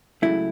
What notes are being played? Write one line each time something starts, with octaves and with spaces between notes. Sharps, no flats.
C#2 C#3 F#3 A3 E4